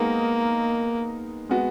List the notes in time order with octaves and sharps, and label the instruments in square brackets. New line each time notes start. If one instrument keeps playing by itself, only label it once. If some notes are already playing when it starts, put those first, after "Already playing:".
Already playing: [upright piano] G#3 B3 D#4 A#4 [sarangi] A#3
[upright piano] G#3 B3 F#4